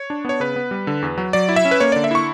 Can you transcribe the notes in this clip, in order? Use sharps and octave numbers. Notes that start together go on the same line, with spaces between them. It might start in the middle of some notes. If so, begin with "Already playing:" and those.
Already playing: C#5
D4
B3 C#5
C#3 B4
B3
G3
D3
E2
F#3
F#3 D5
E4
E5
C#4
B4
A#3 C#5
D3 D5
E5
E4 C#6